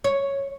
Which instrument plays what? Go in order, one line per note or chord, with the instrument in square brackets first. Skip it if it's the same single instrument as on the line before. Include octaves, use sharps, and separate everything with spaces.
[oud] C#5